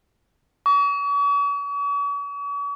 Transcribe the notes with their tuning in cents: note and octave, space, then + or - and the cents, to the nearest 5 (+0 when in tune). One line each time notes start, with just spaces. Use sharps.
C#6 +45